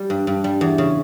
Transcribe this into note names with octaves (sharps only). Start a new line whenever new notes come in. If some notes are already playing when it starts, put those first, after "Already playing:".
Already playing: G3 G4
G2
G2
G3
E2
C#3